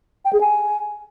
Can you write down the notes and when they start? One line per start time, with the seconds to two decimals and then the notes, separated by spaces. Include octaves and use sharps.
0.25 G5
0.33 G#4
0.41 G#5